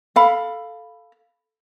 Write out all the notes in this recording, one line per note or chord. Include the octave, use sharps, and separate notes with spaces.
A4 F5 B5